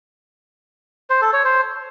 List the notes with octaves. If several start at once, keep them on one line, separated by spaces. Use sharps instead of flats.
C5
A4
C#5
C5